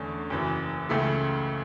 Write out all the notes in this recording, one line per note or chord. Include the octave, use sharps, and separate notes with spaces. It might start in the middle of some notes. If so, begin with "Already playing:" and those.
Already playing: E2 D3 A3 C#4
F#1 F#2 E3
C#2 C#3 E3 A3 E4